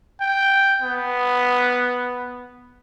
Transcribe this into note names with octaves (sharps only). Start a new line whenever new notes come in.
G5
B3